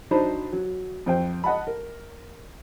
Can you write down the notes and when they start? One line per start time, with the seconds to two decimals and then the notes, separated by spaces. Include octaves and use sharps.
0.11 F#3 D4 D#4 C5 B5
0.53 F#3
1.06 F2 C5 G5
1.44 D#5 F#5 A5 B5
1.67 A#4